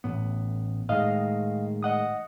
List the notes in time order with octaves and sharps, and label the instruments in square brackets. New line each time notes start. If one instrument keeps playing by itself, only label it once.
[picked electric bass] A1 A2 B3
[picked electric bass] A2 D#3 G#3 [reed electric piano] D#5 F5
[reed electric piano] D#5 F#5 D#6